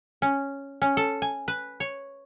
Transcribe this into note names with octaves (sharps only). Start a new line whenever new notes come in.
C#4
C#4
A4
G#5
B4
C#5